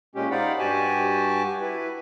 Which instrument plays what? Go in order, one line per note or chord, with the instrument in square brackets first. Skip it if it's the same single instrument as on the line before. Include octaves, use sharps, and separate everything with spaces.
[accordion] A#2 G#3 C#4 G4
D#4 C5 D5 F5 F#5 B5
G2 F#4 G4 G#5 A5
E4 B4